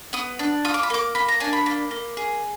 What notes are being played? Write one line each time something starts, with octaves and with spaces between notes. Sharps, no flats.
B3 D#6
D4
F4 D#6
D6
B5
A#3 D6
A#3 B5
A#5
D4 G#5
B5
A#3
A#3
G#4